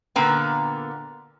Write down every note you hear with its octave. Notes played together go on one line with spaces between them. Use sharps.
A#2 D3 A#3 B3 B4 G5